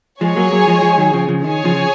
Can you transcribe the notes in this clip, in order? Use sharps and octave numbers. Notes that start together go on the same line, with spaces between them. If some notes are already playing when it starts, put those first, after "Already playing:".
F3 G#3 G#4 C#5 G#5
F#3 A#3
F#3 A#3
F3 G#3
F3 G#3
D#3 F#3
C#3 F3
C#3 F3
D#3 G#4 C#5 G#5
C#3 F3
F3